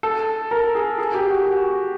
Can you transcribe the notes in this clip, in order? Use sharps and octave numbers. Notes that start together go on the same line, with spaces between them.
A4
A#4
G#4
G#4
G4
F#4
F#4